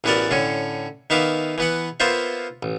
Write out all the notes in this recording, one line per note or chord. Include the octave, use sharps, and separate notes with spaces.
A1 E3 B3 F#4 A#4 D5
A2 D3 C#4
D#3 B3 E5 F5 D6
E3 B3 F#5
A#3 B3 F4 C5 E5
A1